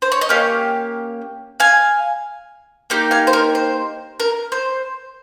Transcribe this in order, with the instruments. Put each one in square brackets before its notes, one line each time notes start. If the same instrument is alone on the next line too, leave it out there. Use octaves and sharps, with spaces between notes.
[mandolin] C5
C#5
D#5
A#3 C#4 G4 C#5 F5
F5 G#5
A#3 D#4 G4
F5 G#5
C5
A#4
C5
A#4
C5